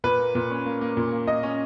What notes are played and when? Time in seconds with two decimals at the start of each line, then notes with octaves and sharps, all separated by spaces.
0.04 A#2 B4
0.19 A#3
0.35 A#2
0.50 C#4
0.66 A#3
0.81 A#3
0.97 A#2
1.12 A#3
1.28 A#2 D#5
1.43 C#4